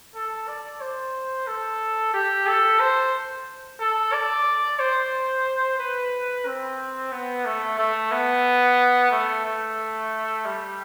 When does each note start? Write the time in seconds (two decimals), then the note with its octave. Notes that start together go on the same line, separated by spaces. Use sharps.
0.15 A4
0.48 D5
0.81 C5
1.47 A4
2.14 G4
2.47 A4
2.80 C5
3.80 A4
4.13 D5
4.80 C5
5.79 B4
6.46 C4
7.12 B3
7.45 A3
7.78 A3
8.11 B3
9.11 A3
9.45 A3
10.45 G3